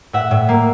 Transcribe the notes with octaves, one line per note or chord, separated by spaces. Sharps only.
A2 E5 F#5
A2
A#3